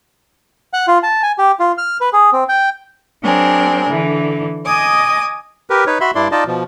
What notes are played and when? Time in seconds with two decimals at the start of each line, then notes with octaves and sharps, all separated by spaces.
0.73 F#5
0.88 F4
1.03 A5
1.23 G#5
1.38 G4
1.60 F4
1.78 F6
2.01 B4
2.13 G#4
2.33 C4
2.49 G5
3.23 F#3 C4 D4 G#4 A#4
3.89 D3 E3
4.65 D#5 G#5 D6 D#6
5.70 G4 A#4 B4
5.87 D#4 B4 C#5
6.01 F#4 E5 B5 C6
6.15 G2 D4 E4 D5 C6
6.32 D#4 F4 D5 D#5 A5
6.47 B2 F3